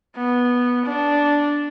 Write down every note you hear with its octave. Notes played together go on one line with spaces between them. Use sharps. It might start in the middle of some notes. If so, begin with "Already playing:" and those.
B3
D4